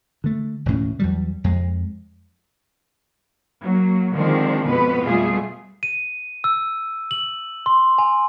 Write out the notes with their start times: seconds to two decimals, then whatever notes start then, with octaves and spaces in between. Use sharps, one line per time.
0.24 D3 A3
0.66 E1 D2 A2 C#4
0.99 E2 F#3 G3
1.44 F2 G#3
3.62 F#3 A#3
4.14 D3 D#3 F3 G#3 C4 D4
4.68 F2 B2 B3 B4
5.02 B2 G3 A3 F4 G#4
5.83 D#7
6.44 E6
7.11 F#7
7.66 C6
7.98 G#5